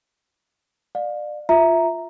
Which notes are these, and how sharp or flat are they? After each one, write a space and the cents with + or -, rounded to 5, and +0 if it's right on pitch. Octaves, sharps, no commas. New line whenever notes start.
D5 +30 F5 +30
F4 +0 E5 +0 A#5 +0